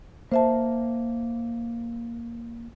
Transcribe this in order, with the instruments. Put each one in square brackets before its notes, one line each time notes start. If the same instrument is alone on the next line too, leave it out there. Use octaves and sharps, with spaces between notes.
[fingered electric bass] A#3 [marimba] C5 E5 A5